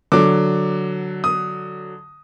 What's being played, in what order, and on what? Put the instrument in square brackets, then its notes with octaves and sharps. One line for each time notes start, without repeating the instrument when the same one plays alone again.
[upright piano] D3 F#3 D6
D#6